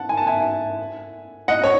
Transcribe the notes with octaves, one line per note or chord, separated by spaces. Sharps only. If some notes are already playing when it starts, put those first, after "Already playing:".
Already playing: F#5 A5
G#5
A5
E5 G#5
D#5 F#5
C#5